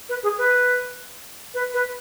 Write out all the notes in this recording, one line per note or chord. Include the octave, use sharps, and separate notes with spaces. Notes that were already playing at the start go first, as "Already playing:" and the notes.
B4
G#4
B4
B4
B4